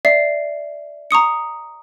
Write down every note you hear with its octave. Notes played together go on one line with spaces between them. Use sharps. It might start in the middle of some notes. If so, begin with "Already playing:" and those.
D5 E5 C7
A#5 C#6 D#6 C#7